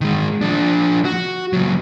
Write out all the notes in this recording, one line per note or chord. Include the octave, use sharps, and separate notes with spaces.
D#3 G#3
F3 D4
F#4
C#2 F#3